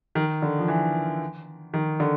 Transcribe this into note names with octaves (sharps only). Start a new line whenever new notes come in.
D#3
D3
F3
E3
D#3
D3